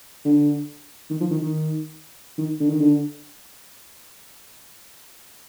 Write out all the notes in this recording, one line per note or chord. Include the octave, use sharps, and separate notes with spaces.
D3
D#3
F3
D#3
D#3
D#3
D3
D#3
D3